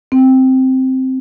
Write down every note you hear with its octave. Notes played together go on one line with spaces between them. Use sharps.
C4